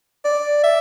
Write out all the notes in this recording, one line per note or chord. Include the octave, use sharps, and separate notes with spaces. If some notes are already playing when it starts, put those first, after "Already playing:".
D5
E5